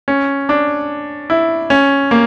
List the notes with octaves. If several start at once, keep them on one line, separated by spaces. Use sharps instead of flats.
C#4
D4
E4
C#4
A#3